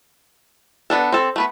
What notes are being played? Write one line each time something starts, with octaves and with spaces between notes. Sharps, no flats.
B3 D4 A4
C4 A4
A3 B3 B4